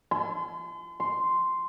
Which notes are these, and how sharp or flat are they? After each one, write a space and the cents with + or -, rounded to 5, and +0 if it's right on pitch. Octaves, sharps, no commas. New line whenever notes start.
C6 -40
C6 -5